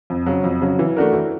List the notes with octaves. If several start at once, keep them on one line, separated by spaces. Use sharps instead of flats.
F2
C#3 F#3
F2
C#3 F#3
E3
A3 D4 F#4 A#4
E3